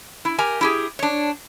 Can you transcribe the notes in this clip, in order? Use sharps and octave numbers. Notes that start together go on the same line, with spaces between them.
E4
G4 A#4 G#5
E4 G4 G#4
D4 C#5